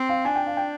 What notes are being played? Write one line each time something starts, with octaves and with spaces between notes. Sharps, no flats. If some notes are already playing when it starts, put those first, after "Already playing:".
Already playing: C4
F5
D4 G#5
G5
F5
G5